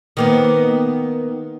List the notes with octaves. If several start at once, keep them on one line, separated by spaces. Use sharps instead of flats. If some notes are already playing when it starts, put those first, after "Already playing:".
D#3 A#3 B3